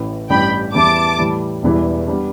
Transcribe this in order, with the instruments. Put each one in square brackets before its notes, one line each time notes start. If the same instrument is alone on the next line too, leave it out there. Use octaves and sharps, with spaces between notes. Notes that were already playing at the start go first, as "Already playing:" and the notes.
Already playing: [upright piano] A1 A2 E3
[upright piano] A1 G2 G3 [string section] G5 B5
[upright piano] E2 E3 G3 E4 [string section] A5 D6
[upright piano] A2 E3 G3
E1 E2 E3 G3 E4
G3 B3 D4